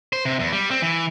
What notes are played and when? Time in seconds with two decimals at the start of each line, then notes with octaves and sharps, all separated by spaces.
0.13 C5
0.25 C3
0.39 E2
0.53 G3
0.71 C4
0.82 E3